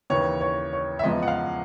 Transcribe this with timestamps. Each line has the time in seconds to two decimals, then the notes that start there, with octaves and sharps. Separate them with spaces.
0.10 D#2 C#3 E3 C#5
0.41 C#5
0.73 C#5
0.99 E5
1.04 E2 C#3 F3 G#3 D#5
1.22 F#5
1.28 F5